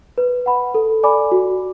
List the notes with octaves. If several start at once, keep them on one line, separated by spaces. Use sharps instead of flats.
B4
F#5 B5
A4
D5 G#5 B5 D6
F#4